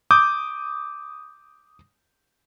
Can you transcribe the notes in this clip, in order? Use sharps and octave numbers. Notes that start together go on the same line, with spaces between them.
D6 D#6 G6